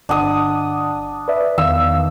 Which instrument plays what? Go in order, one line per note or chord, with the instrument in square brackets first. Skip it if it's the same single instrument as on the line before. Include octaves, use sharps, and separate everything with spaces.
[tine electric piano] G1 F#5 [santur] D4 D#6
[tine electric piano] B4 D5 E5
[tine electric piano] E2 D#3 F5 [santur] E6